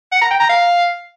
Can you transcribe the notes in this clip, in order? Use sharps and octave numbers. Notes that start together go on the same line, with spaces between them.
F#5
A#5
G5
A#5
F5